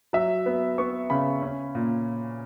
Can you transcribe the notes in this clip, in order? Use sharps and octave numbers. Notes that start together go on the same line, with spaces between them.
F#3 E5
B3
B3 C#6
C#3 B5
C#4
A#2